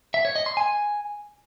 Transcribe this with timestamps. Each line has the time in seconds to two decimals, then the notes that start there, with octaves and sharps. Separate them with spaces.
0.14 E5
0.25 C#5
0.36 D#5
0.46 C6
0.57 G#5